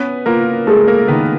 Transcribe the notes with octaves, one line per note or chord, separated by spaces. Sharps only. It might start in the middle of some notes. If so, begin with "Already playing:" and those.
Already playing: B3 C#4 B4
A#3 F4 A#4
G#3 A3 A4
A#3 A#4
D#3 B3 B4